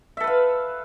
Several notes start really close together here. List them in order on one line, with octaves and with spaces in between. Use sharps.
E5 A4 B4 F5